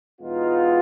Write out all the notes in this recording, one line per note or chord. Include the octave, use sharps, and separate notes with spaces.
E2 B2 G#3 B3 D#4 F4